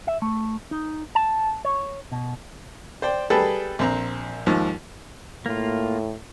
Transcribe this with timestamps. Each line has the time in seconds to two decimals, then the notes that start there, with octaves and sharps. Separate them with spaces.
0.07 E5
0.22 A3
0.71 D#4
1.15 A5
1.65 C#5
2.12 B2
3.02 C5 D5 G5
3.30 G3 G#4 A4 B4 G5 A5
3.79 A#1 C4 A#5
4.46 D#2 G#2 F3
5.46 A2 A#3 F4